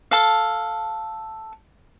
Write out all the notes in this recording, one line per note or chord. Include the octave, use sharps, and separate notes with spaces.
A4 F5